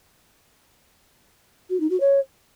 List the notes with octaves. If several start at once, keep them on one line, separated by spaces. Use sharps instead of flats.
F#4
D#4
F#4
C#5